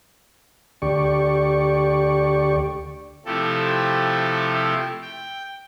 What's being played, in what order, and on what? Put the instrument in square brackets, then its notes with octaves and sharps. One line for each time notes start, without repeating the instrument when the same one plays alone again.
[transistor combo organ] D2 G4 D5 C#6
[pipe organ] C3 F3 A3 E4 G4 A4
G5